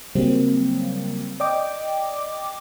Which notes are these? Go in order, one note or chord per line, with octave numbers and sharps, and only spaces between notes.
C#3 F#3 G3 A#3 C4
D5 D#5 G5 D6